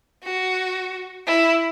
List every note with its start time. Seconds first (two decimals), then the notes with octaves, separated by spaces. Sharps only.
0.23 F#4
1.27 E4